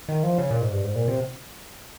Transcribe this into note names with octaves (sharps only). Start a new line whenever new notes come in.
D#3
F3
C#3
A#2
G#2
G2
G#2
A#2
C3